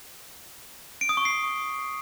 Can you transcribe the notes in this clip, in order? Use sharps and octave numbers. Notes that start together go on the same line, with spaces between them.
D7
D#6
C#6
C7